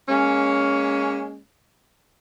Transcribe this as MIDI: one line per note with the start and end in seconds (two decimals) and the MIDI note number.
0.09 1.39 56
0.09 1.39 58
0.09 1.39 61